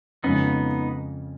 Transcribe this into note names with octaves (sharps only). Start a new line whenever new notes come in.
F2 C#3 F3 G#3 B3 C#4 D#4